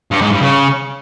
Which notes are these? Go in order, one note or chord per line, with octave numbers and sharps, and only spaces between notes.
G2
G#2
G2
C#3